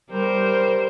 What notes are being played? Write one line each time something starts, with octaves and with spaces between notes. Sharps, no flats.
G3 A#4 C5